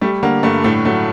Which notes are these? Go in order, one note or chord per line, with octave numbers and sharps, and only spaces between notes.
G3 A3
D3 A#3
G2 A3
A2 A3
F#3 A3